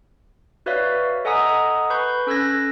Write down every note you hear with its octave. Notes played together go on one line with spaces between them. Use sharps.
F#4 B4 C#5 D5 E5 F5
A4 D#5 F#5 G#5 A#5 D#6
B4 B5 C#6 G6
C#4 A4 E6 F#6 G#6 A#6